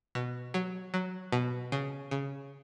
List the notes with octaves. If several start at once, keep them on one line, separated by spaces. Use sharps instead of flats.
B2
F#3
F#3
B2
C#3
C#3